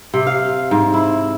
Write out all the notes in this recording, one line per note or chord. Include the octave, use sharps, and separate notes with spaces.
C3
F5
G#2
E4